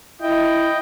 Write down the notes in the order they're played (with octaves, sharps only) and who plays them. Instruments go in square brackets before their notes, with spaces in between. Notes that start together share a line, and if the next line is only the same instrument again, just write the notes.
[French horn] E4 [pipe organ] D#5 G5